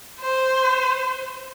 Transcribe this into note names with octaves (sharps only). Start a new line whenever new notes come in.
C5